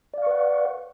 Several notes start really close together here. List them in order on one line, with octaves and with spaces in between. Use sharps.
D5 F5 C#6 B4 F#5